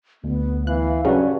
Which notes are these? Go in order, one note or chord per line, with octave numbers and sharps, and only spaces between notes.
D2 B3
E3 F5 F#6
G2 C#3 F#3 C#4 F#4 B4 D5